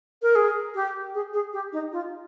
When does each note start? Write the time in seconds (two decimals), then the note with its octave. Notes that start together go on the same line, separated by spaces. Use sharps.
0.22 A#4
0.35 G#4
0.75 G4
1.14 G#4
1.33 G#4
1.53 G4
1.73 D#4
1.92 F4